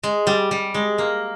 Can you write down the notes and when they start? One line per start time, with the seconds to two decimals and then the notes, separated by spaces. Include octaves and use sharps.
0.03 G#3
0.27 G3
0.51 G3
0.74 G#3
0.98 A#3